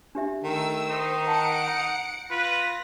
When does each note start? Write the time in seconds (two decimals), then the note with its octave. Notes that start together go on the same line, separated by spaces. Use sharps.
0.15 D4 G4 E5
0.44 D#3 A3 E6
0.90 D#4 C5
1.27 F#5 A5 A#5 C#7 D7
1.68 A#5
2.31 F4 B4 A#6